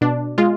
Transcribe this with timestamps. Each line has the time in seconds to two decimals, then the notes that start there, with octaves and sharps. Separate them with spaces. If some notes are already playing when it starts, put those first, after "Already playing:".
0.01 B2 D4
0.38 G#3 F4